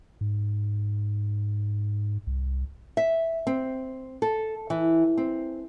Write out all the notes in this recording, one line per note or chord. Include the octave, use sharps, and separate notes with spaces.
G#2
C2
E5
C4
A4
E3
C4